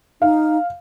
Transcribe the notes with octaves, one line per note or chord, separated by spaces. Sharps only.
D#4 F5